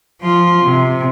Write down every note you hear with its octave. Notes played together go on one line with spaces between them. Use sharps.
F3 F4
C3